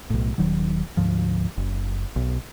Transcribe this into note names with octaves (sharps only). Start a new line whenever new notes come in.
B1 A2
D#1 D#3 F#3
D2 G#2 F3
F#1
B1